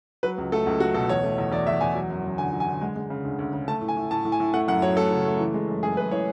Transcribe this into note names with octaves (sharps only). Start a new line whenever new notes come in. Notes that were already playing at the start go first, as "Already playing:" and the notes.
F#3 B4
C#2
A3 A4
C#2
F#3 F#4
B2 A4
E2 C#5
A3
E2
E2 D5
E2 E5
E2 G#5
F#3
F#2
F#2
D3 G#5
F#3
G#5
D3
G#3
G#3
C#3
D2
D2
C#3
A3 A5
A2
G#5
A2
A2 A5
A2
G#5
A2
A3 F#5
F#2 F#5
F#3 C#5
A3 A4
C#3
A3
E3
G#3
F#2
F#2 G#4
F#2 B4
E3 C#5